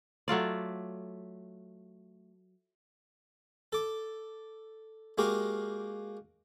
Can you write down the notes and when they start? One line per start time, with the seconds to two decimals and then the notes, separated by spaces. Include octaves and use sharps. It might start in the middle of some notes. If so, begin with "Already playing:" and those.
0.28 F#3 A3 F4 D5
3.72 A4 D6
5.18 G#3 A#3 F#4 G4 A#4 F5